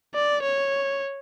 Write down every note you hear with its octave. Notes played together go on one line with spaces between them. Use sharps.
D5
C#5